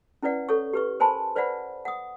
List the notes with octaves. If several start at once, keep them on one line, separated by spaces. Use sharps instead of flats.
C#4 E4 B4 D5 F#5
A4 C#5 C#6
G4 B4 C#6
A#4 C5 G#5 A5 B5 C6
B4 C5 D5 F5 F#5 B5
F#5 D#6